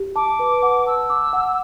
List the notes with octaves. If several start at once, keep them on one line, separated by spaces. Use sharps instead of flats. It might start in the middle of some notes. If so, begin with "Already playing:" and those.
Already playing: G4
A5 D6
B4
F#5
A5 E6
D6
F#5